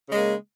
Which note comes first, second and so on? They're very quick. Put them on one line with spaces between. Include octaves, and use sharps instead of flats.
C#3 G#3 A#3